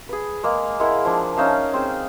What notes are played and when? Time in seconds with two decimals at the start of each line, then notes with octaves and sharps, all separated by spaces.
0.09 G#4 B4
0.43 G#3 A#3
0.80 G#3 A#3 E4 F#5
1.05 F3 D4
1.37 C#4 D#4 E5 F5
1.73 C4 G#4